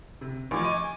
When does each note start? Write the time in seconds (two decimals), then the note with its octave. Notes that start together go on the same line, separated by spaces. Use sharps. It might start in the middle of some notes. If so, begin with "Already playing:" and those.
0.21 C3
0.51 A1 F3 G#5 C#6 D6
0.64 D#5 D#7